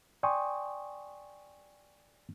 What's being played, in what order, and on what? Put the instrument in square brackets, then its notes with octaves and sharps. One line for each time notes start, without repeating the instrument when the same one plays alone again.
[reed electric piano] D5 G5 G#5 C6 C#6 D#6